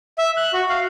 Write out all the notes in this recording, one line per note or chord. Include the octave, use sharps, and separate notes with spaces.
E5
F#6
F#4
F5